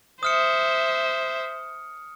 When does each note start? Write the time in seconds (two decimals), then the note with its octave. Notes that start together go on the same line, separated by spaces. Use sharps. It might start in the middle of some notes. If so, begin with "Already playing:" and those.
0.23 C5 E5 D#6 F6 C#7